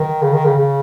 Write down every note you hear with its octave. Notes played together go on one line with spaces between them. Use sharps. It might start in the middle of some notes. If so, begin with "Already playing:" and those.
Already playing: D#3
C#3
D#3
C#3
C#3